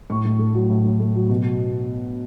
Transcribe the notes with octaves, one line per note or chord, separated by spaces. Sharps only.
A2 C#6
A2
A3
F#3
A2
A2
A3
F#3
B2